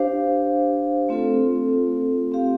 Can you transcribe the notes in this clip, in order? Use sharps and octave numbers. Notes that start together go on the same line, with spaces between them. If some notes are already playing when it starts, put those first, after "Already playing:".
Already playing: D4 G4 C5 F5
A3 C4 F4 A4
C4 G4 F5